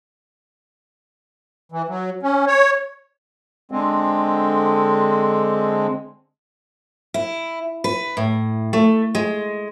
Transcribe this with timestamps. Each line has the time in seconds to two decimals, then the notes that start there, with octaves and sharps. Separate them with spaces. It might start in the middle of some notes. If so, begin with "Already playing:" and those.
1.72 E3
1.88 F#3
2.23 C#4
2.47 C#5
3.72 D3 G#3 C4
7.14 E4
7.84 B4
8.17 A2
8.73 A3
9.15 G#3